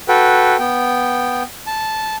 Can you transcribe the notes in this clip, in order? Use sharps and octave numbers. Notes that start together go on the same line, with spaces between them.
F#4 A4 B4 G5
B3 G5
A5